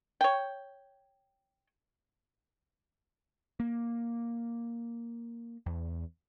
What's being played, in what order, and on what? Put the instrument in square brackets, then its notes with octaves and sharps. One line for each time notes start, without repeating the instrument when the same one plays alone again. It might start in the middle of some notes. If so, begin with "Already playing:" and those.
[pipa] C#5 G5
[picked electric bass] A#3
E2